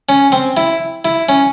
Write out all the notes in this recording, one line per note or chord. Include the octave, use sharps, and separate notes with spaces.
C#4
C4
E4
E4
C#4